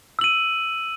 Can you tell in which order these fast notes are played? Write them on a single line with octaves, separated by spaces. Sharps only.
E6 F#7 D#7